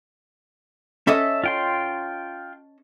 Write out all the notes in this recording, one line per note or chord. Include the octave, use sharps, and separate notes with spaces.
C#4 A4 D#5 E5
F4 G5 C6